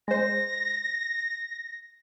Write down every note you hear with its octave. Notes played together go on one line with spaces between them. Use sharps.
G#3 C5 A#6